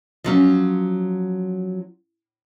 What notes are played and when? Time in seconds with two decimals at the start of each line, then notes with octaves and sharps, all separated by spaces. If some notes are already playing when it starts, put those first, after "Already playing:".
0.24 F3 F#3 C#4